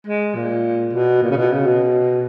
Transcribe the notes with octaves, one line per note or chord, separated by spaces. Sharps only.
G#3
A#2
B2
A#2
C#3
B2
C#3
B2